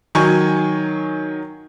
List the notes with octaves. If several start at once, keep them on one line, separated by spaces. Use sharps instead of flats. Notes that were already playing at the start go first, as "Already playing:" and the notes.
D#3 F#3 G#5 C#6 G#6